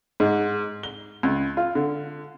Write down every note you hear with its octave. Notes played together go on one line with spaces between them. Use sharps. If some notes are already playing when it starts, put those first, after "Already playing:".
G#2
G7
C#2
F4
D3